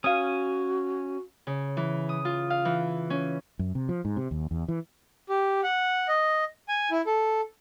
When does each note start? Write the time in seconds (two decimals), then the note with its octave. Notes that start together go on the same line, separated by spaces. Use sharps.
0.04 C#4 F#4 F5 G#5 D#6
1.47 C#3
1.77 E3
2.09 D#6
2.25 F4
2.50 F5
2.65 E3
3.10 C#4
3.59 F#2
3.75 C3
3.89 F3
4.05 G#2
4.17 C3
4.31 D#2
4.51 E2
4.68 E3
5.29 G4
5.63 F#5
6.08 D#5
6.68 G#5
6.91 E4
7.07 A4